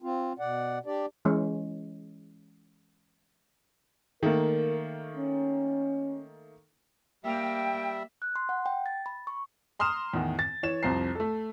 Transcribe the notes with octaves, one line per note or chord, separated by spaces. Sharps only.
C4 F4
B2 D5 F#5
D4 G4 D5
E3 G#3 C#4
D#3 A3 A#3 A#4
C#4
G3 A#3 E5 G5
F#6
C6
F#5
G5
A6
B5
C#6
A#5 C6 D#6 F6 E7
E2 A2 D#3
A6
E3 C#5 E7
C2 F2 C5 A#5 C7
A3 A4